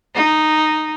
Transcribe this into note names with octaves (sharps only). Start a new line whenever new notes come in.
D#4